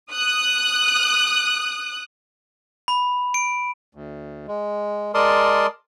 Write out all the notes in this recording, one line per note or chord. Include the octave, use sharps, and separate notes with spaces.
D#6 F#6
B5
D7
D2
G#3
G#3 A#4 D5 A5 C6 D#6